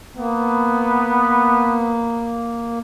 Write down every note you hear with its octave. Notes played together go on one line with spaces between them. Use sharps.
A#3 B3